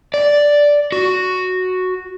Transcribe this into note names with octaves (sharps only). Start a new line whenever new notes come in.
D5
F#4